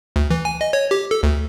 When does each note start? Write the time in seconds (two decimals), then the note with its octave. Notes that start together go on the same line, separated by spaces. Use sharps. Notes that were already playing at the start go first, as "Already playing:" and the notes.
0.16 D2
0.30 E3
0.45 G#5
0.61 D#5
0.73 C#5
0.91 G4
1.11 A4
1.23 D2